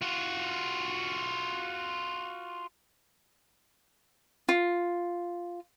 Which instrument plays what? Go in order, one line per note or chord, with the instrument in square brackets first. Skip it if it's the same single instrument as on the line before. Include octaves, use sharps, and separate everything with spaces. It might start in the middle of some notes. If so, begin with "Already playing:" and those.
[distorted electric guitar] F4 F#4
[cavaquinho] F4